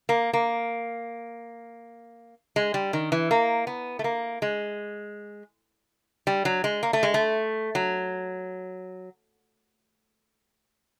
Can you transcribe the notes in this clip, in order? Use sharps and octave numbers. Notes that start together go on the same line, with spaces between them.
A#3
A#3
G#3
G3
D#3
E3
A#3
B3
A3
A#3
G#3
G3
F#3
G#3
A#3
A3
G#3
A3
F#3